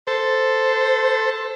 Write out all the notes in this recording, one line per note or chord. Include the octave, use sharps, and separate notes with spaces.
A4 C5